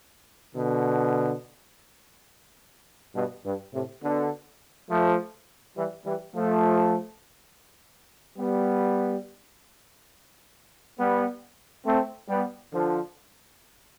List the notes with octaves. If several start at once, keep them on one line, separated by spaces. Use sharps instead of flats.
B2 D3
G2 B2
G2
A2 C3
B2 D3
F3 A3
E3 G3
E3 G3
F3 A3
G3 B3
G3 B3
A3 C4
G3 B3
D3 F3